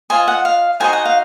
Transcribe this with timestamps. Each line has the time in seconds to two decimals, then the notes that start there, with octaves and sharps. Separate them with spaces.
0.10 F4 C5 D#5 G#5
0.28 F#5
0.45 F5
0.80 D#4 F#4 C5 D#5 G#5
0.93 F#5
1.05 F5